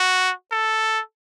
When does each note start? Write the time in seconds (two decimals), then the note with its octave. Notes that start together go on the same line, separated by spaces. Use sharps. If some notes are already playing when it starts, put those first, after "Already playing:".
Already playing: F#4
0.52 A4